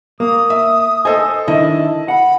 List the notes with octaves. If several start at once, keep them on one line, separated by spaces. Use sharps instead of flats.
A#3 D#6
E5
A4 C5 D#5 G#5
D#3 D4 E4 D#5 A5
F#5 B5